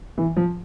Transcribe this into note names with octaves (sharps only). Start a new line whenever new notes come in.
E3
F3